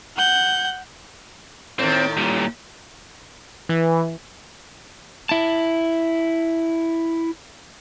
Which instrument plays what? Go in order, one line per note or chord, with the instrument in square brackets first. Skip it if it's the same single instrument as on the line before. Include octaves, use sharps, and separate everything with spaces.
[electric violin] F#5 G6
[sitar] A2 D#3 [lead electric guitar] C4
[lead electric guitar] A#2 G3
[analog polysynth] E3
[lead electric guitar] E4 A5